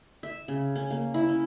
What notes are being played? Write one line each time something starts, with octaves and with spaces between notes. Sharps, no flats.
E5
C#3
C#4
A#3
E4
C#4